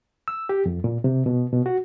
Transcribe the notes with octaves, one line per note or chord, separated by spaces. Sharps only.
E6
G4
F2
A#2
C3
B2
B2
F#4